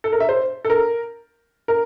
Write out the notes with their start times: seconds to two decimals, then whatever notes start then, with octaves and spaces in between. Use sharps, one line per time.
0.04 A4
0.13 A#4
0.20 E5
0.29 C5
0.65 A4
0.70 A#4
1.68 A#4